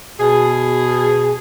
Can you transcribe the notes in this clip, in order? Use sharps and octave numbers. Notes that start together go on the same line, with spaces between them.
B2 G#4